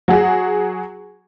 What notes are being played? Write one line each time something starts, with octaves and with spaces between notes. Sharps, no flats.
F#3 F#4 G#4